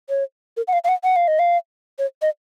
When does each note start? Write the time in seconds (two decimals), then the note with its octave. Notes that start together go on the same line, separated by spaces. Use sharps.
0.09 C#5
0.57 A#4
0.67 F#5
0.73 F5
0.84 F5
0.88 F#5
1.04 F#5
1.16 F5
1.28 D#5
1.39 F5
1.99 C#5
2.22 D#5